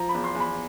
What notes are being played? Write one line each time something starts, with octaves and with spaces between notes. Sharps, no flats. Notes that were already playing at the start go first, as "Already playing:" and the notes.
Already playing: F3 A#5
B5
E2
C6
E2
B5